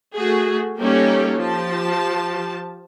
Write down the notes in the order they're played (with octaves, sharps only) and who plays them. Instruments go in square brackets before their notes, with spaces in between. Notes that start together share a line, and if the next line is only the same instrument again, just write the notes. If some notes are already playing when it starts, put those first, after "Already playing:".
[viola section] A3 F#4 G#4
G3 A#3 C#4 D#4 G4 A4
F3 G4 A5